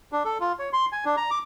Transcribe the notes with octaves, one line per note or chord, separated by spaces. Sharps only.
D4
A4
F4
C#5
C6
G#5
D4
A#5
D6